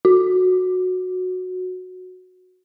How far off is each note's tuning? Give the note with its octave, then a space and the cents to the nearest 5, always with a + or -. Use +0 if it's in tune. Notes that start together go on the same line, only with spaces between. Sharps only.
F#4 -10